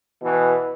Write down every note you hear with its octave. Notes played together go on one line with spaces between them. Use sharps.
B2 E3